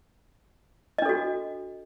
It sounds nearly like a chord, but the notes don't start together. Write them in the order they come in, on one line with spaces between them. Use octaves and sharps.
D#5 D4 A4 F#4